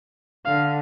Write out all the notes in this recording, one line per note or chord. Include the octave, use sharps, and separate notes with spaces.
D3 F5